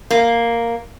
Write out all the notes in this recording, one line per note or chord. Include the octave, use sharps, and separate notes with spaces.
A#3